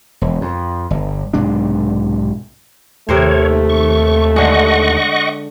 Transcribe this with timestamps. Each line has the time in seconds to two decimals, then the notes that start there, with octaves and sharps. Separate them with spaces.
0.21 E1
0.41 F2
0.91 G1
1.34 B1 G#2 C3 D4
3.09 D#2 C3 A3 A#4 C5 C#5
3.69 C#6
4.36 D3 G#3 D#5 F#5 C#6